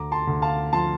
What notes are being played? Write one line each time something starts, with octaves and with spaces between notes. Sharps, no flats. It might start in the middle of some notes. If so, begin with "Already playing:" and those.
Already playing: D2 A#5 D6
A5 C6
D2
F5 A5
F3 A5 C6